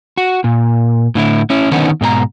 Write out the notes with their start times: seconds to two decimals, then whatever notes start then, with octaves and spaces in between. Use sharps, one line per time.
0.17 F#4
0.44 A#2
1.15 A2 D3 E4
1.50 C#4 E4
1.71 D3 D#3 B3 C#4 D#4
2.01 G#2 B2 G4 A#5